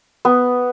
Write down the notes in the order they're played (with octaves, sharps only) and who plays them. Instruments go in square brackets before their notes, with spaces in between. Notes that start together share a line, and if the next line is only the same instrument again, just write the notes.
[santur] B3